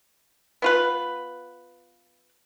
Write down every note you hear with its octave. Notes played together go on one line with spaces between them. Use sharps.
B3 F4 B4